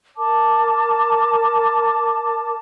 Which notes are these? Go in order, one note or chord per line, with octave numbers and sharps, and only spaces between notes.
A#4 A5 D6